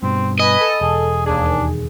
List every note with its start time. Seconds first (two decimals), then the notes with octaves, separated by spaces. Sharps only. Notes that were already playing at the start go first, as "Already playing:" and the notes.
0.03 G2 B2 C4
0.40 B4 D#5 G#5 B5
0.61 A4
0.81 E1 G#4
1.26 D#2 D4 G#4